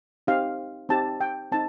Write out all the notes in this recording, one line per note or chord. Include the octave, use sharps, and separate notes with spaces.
C4 D#4 G4 F5
C4 D#4 G4 A5
G5
C4 D#4 A5